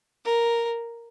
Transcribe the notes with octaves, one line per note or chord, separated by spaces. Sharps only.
A#4